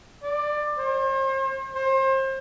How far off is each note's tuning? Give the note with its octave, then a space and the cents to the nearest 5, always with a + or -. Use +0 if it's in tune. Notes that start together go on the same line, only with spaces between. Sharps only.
D5 +20
C5 +40
C5 +35